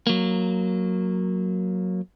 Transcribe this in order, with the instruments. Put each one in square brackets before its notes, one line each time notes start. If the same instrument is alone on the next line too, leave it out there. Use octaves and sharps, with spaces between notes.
[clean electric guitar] F#3 A#3